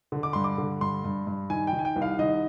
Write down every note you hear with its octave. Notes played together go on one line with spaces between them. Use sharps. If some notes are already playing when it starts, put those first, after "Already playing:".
D3
D6
G2 C6
D6
D3
G2 C6
G2
G2
D#3 G#5
G5
D#3
G#5
G5
C2
F5
D#3 D#5